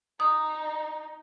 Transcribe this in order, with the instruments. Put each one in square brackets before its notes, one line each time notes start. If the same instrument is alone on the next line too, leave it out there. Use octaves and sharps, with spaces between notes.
[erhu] D#4 [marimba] D#6